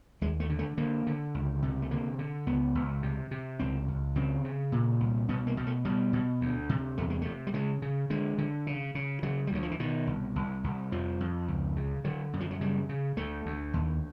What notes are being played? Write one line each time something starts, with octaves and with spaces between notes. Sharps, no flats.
D#2 G#3
A3
D3
A3
D3 A#3
D3
C#2
C3
A3
D3 A#3
D3
C#2 B3
C#2
C3
C3
C#2 C4
C#2
C#3 C4
C#3
A#2
C2
B2 B3
A#3
B2
A3
B2 G3
B2
D2
C3
E2 A3
G#3
C3 A3
G3
C#3 G#3
C#3
D3 G#3
D3
C#3
C#3
C#3 F#3
G3
D2 F#3
F3
E3
B2 D#3
C2
C2
C2
F2 F3
F2
C#2
C#3
D3 F#3
F#2
F3
F#3
C#3 G3
C#3
D2 A3
D2
D#2